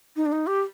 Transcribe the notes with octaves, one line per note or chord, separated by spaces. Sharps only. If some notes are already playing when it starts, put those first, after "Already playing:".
D#4
D4
D#4
G4